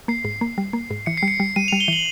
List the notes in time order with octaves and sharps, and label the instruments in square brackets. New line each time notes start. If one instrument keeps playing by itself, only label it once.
[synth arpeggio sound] A#3 [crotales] C7
[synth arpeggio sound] G#2
A#3
G3
A#3
G#2
[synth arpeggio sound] E3 [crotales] C#7
[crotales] C7
[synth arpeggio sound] G3
[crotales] C#7
[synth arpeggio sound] G3
[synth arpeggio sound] G3 [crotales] D#7
[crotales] F7
[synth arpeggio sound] G3
[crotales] G7
[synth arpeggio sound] E3 [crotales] F#7